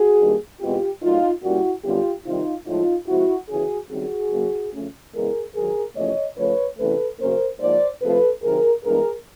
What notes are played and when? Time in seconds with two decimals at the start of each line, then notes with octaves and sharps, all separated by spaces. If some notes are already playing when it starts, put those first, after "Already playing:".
Already playing: F#4 G#4
0.20 G2 D#3 G3 A#3
0.61 E2 B2 G#3 C4 F4 G4
1.02 A#2 F#3 A3 D#4 F4
1.43 A#2 G3 A#3 C#4 E4 F#4
1.84 F#2 D3 G3 B3 F4 G4
2.25 C3 D#3 G3 D#4 F4
2.67 A2 F3 G#3 D#4 F4
3.08 C3 F3 G#3 E4 F#4
3.49 E2 C#3 E3 F#4 G#4
3.90 F#2 D#3 G3 C4 F#4 G#4
4.31 F#2 C#3 F#3 A#3
4.73 C#3 F3 A3 C#4
5.13 E2 C#3 E3 G#3 B3 G#4 A#4
5.55 G#2 D#3 F#3 G#4 A#4
5.96 E2 C3 F3 A3 C#4 C#5 D#5
6.37 C#3 F3 A3 B4 C#5
6.78 E2 C3 E3 A3 C#4 A4 B4
7.20 F#2 C#3 F#3 A#3 C#4 A#4 C5
7.61 G#2 F3 A#3 C5 D5
8.02 C3 F3 A3 C4 A4 B4
8.43 C3 D#3 F#3 G#4 A#4
8.84 G2 E3 G#3 B3 D4 G#4 A#4